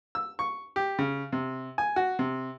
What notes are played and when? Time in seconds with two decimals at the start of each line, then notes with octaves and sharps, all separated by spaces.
0.15 E6
0.39 C#6
0.76 G4
0.99 C#3
1.32 C3
1.78 G#5
1.96 F#4
2.19 C3